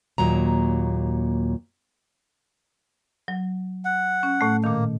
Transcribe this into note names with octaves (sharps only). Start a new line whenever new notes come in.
D#2 A#2 F#3 A#5
F#3
F#5
C#4
A2 A3
A#2 D#3 A#3